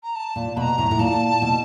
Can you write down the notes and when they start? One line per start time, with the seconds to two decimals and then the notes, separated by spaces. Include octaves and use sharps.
0.03 A#5
0.15 A5
0.36 A#2
0.56 B2 A#5 B5
0.78 A2
0.91 A2
0.99 A#2 A5
1.42 B2